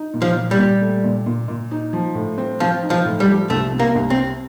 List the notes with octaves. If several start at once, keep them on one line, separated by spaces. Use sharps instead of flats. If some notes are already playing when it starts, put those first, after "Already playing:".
Already playing: D#4
A#2
F3
A#2
G3
A#2
A3
A#2
A#2
A#2
D#4
F3
A2
C4
F3 C4
D#4
F3
A2
G3
F3
C2 A3
C3
A#3
C2
C4
C3